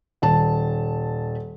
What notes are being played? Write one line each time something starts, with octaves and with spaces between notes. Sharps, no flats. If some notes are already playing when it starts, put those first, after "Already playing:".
D#1 A5